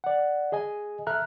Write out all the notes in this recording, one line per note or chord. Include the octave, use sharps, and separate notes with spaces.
D5 F#5
G#4 D#5 G#5
A4 E5 A#5 F6 F#6